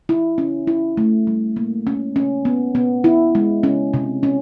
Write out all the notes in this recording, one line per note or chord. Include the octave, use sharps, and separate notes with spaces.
E4
C#4
E4
A3
G3
A#3
C#4
C#4
B3
B3
E4
G#3
C#4
C3
C#4